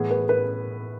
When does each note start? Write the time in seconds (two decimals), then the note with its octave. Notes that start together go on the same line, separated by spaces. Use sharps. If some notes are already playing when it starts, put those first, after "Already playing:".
Already playing: A2 E3 B3 G#4
0.10 B4
0.29 B4